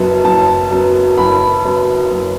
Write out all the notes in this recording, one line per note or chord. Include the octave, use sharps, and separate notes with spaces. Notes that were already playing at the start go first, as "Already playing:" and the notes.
Already playing: F#1 F#2 F#3 B3 A5
F#1 A5
F#2 F#3 B3
F#1 B5
F#2 F#3 B3
F#1